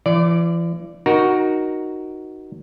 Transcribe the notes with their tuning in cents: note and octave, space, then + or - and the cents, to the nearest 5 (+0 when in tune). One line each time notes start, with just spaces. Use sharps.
E3 +45 D5 +0
D#4 -5 F#4 +0 A#4 +20